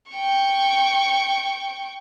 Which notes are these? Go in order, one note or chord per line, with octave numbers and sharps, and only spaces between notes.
G5 C#6